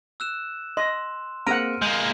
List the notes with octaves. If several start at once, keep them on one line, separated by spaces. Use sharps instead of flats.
E6 F#6 E7
D#5 C6
A#3 C4 G#4 F#5 A#5 F6 D7 D#7
G#3 A#3 G6